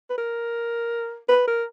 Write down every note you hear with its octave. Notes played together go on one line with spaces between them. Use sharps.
B4
A#4
B4
A#4